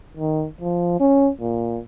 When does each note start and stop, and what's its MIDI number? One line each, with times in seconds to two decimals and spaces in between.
0.17 0.46 51
0.61 0.96 53
1.00 1.30 61
1.40 1.80 46